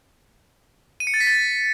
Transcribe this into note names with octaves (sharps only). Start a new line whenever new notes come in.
D#7
C#7
A6
B6
A6